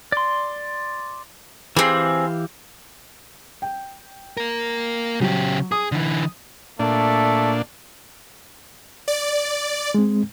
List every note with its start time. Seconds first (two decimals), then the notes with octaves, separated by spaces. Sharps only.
0.12 D5 C6
1.77 E3 C4 G4 G#4 F5
3.62 G5
4.37 A#3 A#4
5.21 C#3 F#3 G4
5.72 G#4 D#6
5.92 D3 E3
6.79 A#2 A3 D4
9.08 D5
9.94 G#3 C4